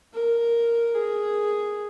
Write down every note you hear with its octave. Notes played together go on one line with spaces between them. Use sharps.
A#4
G#4